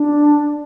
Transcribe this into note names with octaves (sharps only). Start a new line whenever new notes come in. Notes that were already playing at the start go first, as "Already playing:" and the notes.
Already playing: D4